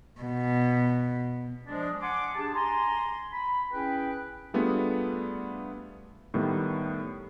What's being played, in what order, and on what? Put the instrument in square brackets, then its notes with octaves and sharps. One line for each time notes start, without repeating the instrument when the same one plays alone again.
[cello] B2
[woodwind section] F3 G#3 D4
F#5 G#5 C6 D6
D4 G4 G#4 A5
G#5 A#5 C6
B5
C#4 E4 G#4 B4 G5
[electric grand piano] G3 A3 B3 D4 F4 G#4
A2 D#3 G3 B3